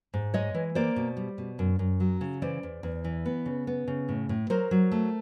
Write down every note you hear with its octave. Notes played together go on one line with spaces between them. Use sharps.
G#2
G#3 C#5 D#5
E3
A#3 C5 D5
B2
G3
B2
F#2
F#2
F#3
C#3
E3 C5 D5
E2
E2
E3
B3
C#3
B3
C#3
A2
A2
F#3 A#4 C5
F#3
A3